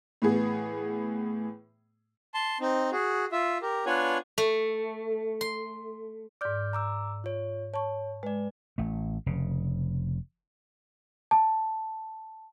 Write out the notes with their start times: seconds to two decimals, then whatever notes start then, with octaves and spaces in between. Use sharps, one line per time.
0.22 A2 E3 B3 G#4
2.34 A5 C6
2.61 C4 D#4
2.92 F#4 G#4
3.32 F4 E5
3.62 G4 A#4
3.86 B3 D4 F4 C#5 F#5 G#5
4.38 A3
5.41 C6
6.41 G#2 D5 D6 F6 G6
6.73 A#5 D6 E6
7.24 F4 C#5
7.74 C#5 A5 C#6
8.23 G#3 B4 D5
8.78 A1 A3
9.26 F1 C#3
11.31 A5